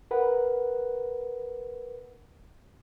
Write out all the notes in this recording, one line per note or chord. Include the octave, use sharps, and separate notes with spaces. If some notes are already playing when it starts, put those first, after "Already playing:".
A#4 B4 F#5